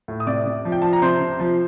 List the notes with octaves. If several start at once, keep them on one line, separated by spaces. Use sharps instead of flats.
A2
D#6
C3 D5 D6
C3
F3
G5
F3 A5
A#5
C3 C5 C6
C3
F3